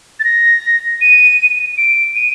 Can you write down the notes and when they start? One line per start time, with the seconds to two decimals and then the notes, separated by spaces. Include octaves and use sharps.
0.20 A6
0.24 A#6
1.01 D#7
1.78 D7
2.15 D#7